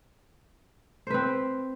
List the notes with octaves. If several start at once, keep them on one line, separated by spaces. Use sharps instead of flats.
C4 B4 C5